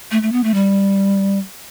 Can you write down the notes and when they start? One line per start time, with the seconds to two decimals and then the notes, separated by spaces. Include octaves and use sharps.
0.11 A3
0.22 A3
0.32 B3
0.44 A3
0.54 G3